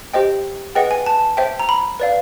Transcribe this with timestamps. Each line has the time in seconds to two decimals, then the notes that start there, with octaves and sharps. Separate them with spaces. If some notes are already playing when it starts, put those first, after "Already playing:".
0.14 G4 C5 D#5 G5
0.75 G#4 B4 D#5 F#5 G5
0.91 G#5
1.06 A5
1.37 C5 E5 G5
1.59 A#5
1.69 B5
2.00 B4 D5 F5